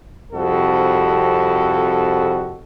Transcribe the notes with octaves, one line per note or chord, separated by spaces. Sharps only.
C2 F2 F#4 A4